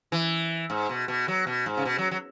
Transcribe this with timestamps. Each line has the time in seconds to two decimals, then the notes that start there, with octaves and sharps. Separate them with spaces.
0.12 E3
0.70 G#2
0.89 B2
1.08 B2
1.28 F#3
1.47 B2
1.66 G#2
1.77 C#3
1.85 B2
1.98 F#3
2.11 F#3